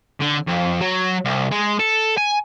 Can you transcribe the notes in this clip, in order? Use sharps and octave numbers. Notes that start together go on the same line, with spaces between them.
D3
F2
F#3
C2
G#3
A4
G#5